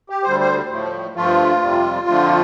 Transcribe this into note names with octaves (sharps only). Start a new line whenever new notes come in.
G4
D2 D3 G3 C5
C5
A2 F3 A3
G2 F3 A3 F4
F2 C3 G3
F2 D3 F3 A3